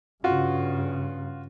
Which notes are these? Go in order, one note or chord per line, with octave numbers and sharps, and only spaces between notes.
G2 C#3 F4 F#4